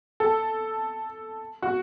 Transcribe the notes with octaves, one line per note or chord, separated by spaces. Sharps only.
A4
F#4